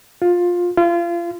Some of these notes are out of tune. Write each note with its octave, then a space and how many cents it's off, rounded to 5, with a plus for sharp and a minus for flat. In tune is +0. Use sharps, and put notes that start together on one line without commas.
F4 +15
F4 -30